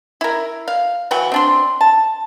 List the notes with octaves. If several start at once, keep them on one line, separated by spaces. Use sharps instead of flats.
E4 A#4
F5
E3 F#3 F#4 G5
C4 D4 C6
A5